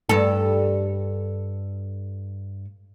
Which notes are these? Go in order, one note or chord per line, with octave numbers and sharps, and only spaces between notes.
G2 A4